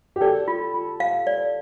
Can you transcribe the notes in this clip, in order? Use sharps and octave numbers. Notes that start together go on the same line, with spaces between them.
G4
A4 D5
F4
F4
F5
D5